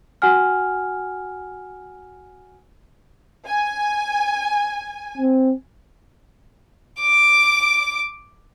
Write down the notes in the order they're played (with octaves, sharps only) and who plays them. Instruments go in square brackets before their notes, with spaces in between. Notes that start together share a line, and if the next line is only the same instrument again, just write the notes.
[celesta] F#4 F#5 G#5 F6
[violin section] G#5
[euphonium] C4
[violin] D6 D7